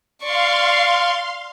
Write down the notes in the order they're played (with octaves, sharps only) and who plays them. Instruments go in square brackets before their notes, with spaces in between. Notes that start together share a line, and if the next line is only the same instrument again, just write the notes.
[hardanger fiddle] D5 C#6 [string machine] F5 C6